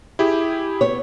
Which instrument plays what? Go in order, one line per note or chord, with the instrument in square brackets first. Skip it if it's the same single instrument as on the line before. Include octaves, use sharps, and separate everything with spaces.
[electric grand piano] E4 G4 G#4
[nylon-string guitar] B3 C#5